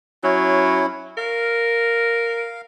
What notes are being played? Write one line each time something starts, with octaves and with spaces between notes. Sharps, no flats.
F#3 C#4 E4
A#4 F5